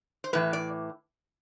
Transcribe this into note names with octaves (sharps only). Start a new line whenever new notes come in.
C5
A2 E3 B4
D5